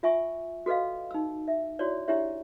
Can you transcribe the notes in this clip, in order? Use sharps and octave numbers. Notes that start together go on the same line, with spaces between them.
F4 E5 G#5 C#6
F#4 A4 B4 D#5 F5
D#4 E6
E5
E4 F#4 C#5 D5
D4 E4 G4 C#5 E5